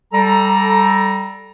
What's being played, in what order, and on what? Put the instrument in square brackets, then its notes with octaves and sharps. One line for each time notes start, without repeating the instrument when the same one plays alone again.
[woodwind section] G3 A4 A#5